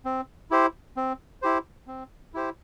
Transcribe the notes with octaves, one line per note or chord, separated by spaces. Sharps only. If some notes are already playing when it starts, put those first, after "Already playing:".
C4
E4 G4 C5
C4
E4 G4 C5
C4
E4 G4 C5